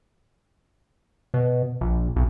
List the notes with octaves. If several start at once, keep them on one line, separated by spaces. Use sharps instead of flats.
B2
A#1
B1